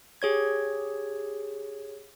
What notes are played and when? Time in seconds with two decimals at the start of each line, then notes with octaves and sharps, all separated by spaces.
0.22 G4 G#4 C#5 G#6